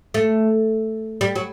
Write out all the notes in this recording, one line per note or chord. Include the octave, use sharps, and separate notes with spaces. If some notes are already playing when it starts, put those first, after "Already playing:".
A3
G3
F#3